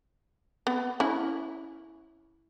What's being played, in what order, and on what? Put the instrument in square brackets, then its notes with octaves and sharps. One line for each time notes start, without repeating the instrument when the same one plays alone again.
[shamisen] B3
C#4 E4